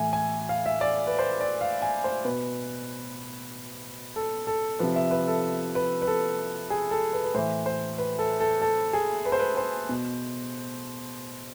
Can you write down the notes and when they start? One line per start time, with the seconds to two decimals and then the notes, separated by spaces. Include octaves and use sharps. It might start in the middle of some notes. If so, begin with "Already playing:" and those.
Already playing: A2 E3 G#5
0.13 G#5
0.49 F5
0.66 E5
0.81 D5
1.07 B4
1.19 C5
1.41 D5
1.61 F5
1.82 G#5
2.04 C5
2.24 B2 B4
4.16 A4
4.47 A4
4.79 C3 F3 B4
4.96 E5
5.11 B4
5.28 A4
5.75 B4
6.02 B4
6.07 A4
6.70 G#4
6.91 A4
7.13 B4
7.24 B4
7.34 A2 E3 C5
7.66 C5
7.98 B4
8.19 A4
8.40 A4
8.62 A4
8.93 G#4
9.25 B4
9.32 C5
9.39 B4
9.57 C5
9.89 B2